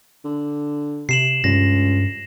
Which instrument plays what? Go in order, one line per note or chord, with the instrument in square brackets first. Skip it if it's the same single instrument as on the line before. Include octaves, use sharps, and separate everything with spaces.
[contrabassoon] D3
[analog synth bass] C3 [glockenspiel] C7 E7 F#7
[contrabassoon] C#2 [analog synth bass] G2 [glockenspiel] A#6